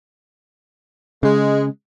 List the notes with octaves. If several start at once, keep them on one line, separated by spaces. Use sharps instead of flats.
C#3 G#3